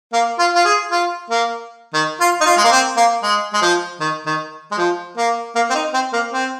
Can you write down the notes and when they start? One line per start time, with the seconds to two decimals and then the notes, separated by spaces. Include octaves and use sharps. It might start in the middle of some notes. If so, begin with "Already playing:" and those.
0.13 A#3
0.39 F4
0.55 F4
0.65 G#4
0.91 F4
1.30 A#3
1.94 D#3
2.20 F4
2.41 D#4
2.46 F4
2.57 G#3
2.64 A#3
2.72 C4
2.97 A#3
3.23 G#3
3.53 G#3
3.62 F3
4.00 D#3
4.26 D#3
4.72 G#3
4.78 F3
5.17 A#3
5.55 A#3
5.70 C4
5.75 D#4
5.94 C4
6.13 A#3
6.34 C4